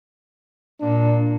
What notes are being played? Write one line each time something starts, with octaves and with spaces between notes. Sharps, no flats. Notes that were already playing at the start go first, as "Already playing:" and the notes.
A#2 D4